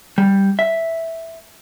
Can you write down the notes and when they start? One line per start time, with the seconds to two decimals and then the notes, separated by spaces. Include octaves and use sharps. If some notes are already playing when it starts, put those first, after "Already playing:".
0.18 G3
0.59 E5